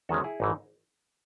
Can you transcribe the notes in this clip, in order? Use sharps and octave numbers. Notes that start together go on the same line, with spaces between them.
E2 D#3 G#3 C#4 F#4 A4
E4 G#4
G#1 G#2 E3 D#4